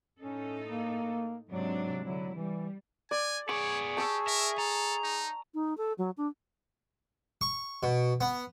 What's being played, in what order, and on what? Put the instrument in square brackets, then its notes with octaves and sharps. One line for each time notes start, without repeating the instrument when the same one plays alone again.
[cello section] A2 D#4 A4 [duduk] C#4
[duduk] A#3
[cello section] G#2 C3 D4 [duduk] F#3
[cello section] D3 E4 [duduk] F#3
[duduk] E3 [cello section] G3
[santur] D5 [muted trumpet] G#5
[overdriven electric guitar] B3 D5 [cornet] G#4 [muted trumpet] C#5 [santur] C#6
[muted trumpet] G4 [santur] A5 C#6 E6
[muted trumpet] A#4 [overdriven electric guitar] E5
[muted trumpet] A4 [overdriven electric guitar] A#5
[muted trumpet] D#4
[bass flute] D#4
A4
F#3
D4
[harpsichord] C#6
B2
B3